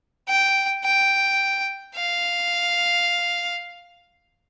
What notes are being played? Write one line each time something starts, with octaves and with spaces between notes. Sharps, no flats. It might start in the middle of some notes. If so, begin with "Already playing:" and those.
G5
G5
F5